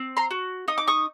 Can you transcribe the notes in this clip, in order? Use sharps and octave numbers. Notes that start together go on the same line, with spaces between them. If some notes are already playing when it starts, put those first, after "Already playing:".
Already playing: C4
A#5 C6
F#4
D#4 D#6
D6
C#6 D#6